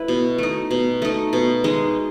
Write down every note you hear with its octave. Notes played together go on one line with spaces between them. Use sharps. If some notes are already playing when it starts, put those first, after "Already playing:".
Already playing: A3 E4 B4
B2
A3 D#4
B2
A3 D#4
B2
G#3 D#4